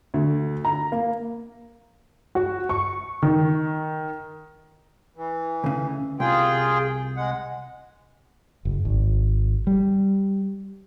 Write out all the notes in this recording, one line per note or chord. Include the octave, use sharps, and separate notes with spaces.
D2
A#5
A#3
F#4
C#6
D#3
E3
D2 C#3
C2 F4 G#4 G5
G#3 F#5
F#1
G#1
G3